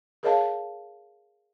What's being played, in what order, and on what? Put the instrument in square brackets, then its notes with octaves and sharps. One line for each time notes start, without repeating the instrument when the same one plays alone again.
[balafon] G#4 A#4 C#5 D#5 F5 A5